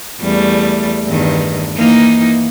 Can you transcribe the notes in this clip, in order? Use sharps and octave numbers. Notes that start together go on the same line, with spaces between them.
E2 G3 A3
E2 G2 D#3
E3 A#3 D#4